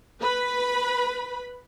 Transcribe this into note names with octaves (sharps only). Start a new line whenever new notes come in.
B4 B5